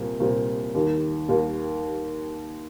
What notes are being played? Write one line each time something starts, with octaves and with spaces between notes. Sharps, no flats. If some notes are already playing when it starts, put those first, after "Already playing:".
Already playing: C2 A#2 G3 C4
C2 A#2 G3 C4
D#2 D#3 G3
D#2 D#3 G3